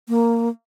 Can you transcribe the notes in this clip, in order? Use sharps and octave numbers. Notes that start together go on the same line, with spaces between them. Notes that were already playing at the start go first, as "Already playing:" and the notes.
A#3